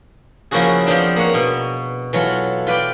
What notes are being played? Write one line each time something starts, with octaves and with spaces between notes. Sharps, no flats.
C#3 F3 A#3 E4 F#4 G#4
F3 B3 C4 D4
A#3 C#5 F#5
B2
E3 F#3 F4 A4
F4 B4 D5 G5